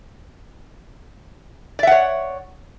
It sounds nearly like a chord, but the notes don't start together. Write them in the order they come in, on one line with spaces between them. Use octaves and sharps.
D5 E5 F#5 C#5